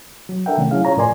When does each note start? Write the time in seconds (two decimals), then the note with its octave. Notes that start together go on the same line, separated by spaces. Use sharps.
0.29 F#3
0.46 D4 A4 A#4 E5 F#5 G5
0.57 C3 D#3 F3 A3 C#4
0.71 F#3 C#4 E4 G#4 F5
0.85 F4 C#5 A#5
0.97 A2 F3 A#4 D5 G#5 C6